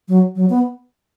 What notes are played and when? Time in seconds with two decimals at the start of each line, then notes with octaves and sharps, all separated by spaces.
0.08 F#3
0.36 F#3
0.50 B3